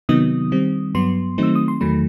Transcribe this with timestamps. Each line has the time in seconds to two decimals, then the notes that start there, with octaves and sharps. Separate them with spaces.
0.09 C3 D#3 F#3 B3 D#4 D#6
0.52 D#3 G3 C4
0.95 G2 F#3 B3 C6
1.38 D#3 F#3 A3 C4 D#4 E6
1.56 D#6
1.68 C6
1.81 E2 D#3 F#3 A3 B5